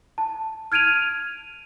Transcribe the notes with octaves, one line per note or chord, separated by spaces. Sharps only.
A5
F6 G#6 D7 D#7 F7